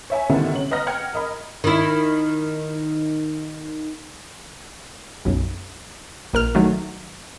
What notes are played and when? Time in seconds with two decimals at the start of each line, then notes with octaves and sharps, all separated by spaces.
0.10 C#5 E5 G#5
0.29 D3 D#3 G3 B3 E4
0.54 C3 C#4 F#7
0.71 B4 D#5 F#5 A#5 F6 A#6
0.87 F#5 G5 F6 G#6 C#7
1.13 A#4 D#5 B5
1.64 D#3 E4
5.25 B1 F#2
6.33 A#1 A#4 F6
6.55 D#3 F#3 A3